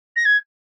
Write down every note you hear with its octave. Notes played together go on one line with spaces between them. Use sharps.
A#6
G#6